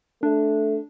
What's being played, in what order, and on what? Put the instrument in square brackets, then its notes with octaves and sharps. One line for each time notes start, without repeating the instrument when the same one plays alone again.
[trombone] A3 [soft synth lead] D4